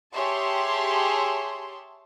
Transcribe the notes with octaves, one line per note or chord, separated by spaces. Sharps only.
G4 G#4 C#5 E5 A5 C6